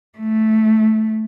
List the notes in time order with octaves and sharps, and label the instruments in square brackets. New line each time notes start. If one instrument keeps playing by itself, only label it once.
[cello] A3